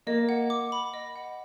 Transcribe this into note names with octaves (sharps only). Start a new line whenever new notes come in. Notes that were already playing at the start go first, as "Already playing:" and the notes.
A#3 D#5
F#5
D6
B5
D#5
F#5